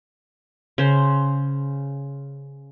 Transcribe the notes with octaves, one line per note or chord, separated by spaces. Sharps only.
C#3 C5